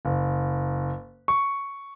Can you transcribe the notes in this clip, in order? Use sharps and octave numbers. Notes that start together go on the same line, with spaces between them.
F#1
C#6